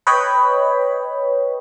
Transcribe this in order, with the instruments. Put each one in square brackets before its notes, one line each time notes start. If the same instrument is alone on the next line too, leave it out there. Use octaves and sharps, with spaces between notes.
[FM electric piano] B4 C#5 D#5 G5 B5